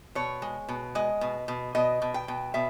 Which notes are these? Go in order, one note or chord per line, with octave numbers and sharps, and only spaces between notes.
B2 C#5
G#3
B2
G#3 D#5
B2
B2
B2 D#5
B2
G5
B2
B2 E5